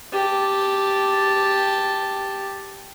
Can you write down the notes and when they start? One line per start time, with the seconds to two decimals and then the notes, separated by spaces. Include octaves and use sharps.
0.13 G4 A5